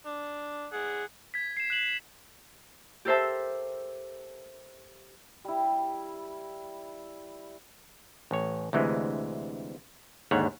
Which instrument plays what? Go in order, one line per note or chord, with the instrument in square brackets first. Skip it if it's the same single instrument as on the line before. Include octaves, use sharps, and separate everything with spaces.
[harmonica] D4
G#4 F#5
[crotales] G#6 B6
C7 E7
F#6 E7 F#7
[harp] G4 A4 A#4 C5 E5 A5
[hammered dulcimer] G3 E4
[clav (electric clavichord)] A1 C#5
D2 C3 E3 G#3
D#2 G#2 D3 C#5 F#5